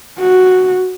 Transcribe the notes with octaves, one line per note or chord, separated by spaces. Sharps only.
F#4